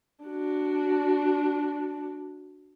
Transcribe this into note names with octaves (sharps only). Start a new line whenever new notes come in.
D4 F#4